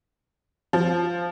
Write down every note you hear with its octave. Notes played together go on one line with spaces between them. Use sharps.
F3